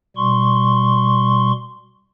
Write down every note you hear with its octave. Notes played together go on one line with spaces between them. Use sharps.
B2 G3 C6 C#6